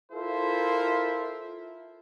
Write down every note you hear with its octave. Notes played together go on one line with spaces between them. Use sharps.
E4 F4 A4 A#4 C5 E5